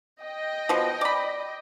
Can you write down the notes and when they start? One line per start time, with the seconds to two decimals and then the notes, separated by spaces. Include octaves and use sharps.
0.22 D#5 G5
0.69 B2 F3
1.01 D5 B5